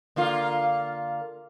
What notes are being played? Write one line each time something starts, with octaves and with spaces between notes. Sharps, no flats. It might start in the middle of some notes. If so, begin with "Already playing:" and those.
D3 A#3 F4